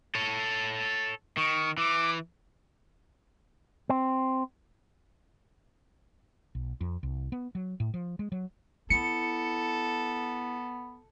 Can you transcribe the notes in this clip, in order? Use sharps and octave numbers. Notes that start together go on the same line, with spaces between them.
A4 C#5
D#3 C#6
E3 D6
C4
B1
F2
C2
B3
F#3
A2
F3
G#3
F#3
B3 E4 A4 C#7